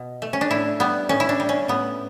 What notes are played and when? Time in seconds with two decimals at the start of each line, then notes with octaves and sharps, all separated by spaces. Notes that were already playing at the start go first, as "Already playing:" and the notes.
Already playing: B2
0.22 A3
0.33 C#4
0.41 D4
0.51 A2 E4
0.80 G3 B3
1.09 A2 C#4
1.20 E4
1.29 D4
1.40 G3
1.49 C#4
1.68 A2 B3